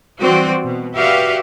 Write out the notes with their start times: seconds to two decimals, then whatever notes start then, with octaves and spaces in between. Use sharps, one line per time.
0.21 E3 G3 C4 F#4 D5
0.63 B2
0.95 F#4 G4 B4 D5 E5 F5